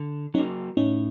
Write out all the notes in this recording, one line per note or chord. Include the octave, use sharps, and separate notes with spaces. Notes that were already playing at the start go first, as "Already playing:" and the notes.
Already playing: D3
F#3 A#3 C#4 D#4
A2 C#4 D#4